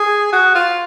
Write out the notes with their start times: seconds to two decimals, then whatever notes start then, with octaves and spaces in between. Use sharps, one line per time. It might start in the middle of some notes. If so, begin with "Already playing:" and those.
Already playing: G#4
0.33 F#4
0.55 F4